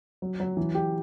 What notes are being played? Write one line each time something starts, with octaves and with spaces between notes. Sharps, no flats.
F#3
F#3
E3
G4